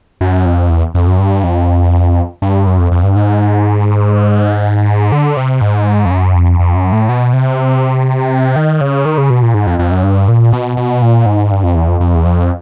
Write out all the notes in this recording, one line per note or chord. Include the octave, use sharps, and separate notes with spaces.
F#2
F2
E2
F2
F#2
G2
F2
G2
F#2
F2
F2
G2
G#2
D3
C3
G#2
F2
F#2
F2
F2
F#2
A2
B2
C3
D#3
C#3
D#3
C#3
B2
A#2
G#2
F2
F2
F#2
G2
A#2
B2
B2
A#2
G#2
G2
F2
E2
F2
F2
E2
F2